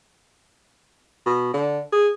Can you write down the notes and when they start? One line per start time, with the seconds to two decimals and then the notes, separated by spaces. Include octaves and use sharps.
1.26 B2
1.54 D3
1.92 G#4